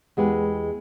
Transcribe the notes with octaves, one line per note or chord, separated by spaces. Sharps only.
E2 G#3 G4 B4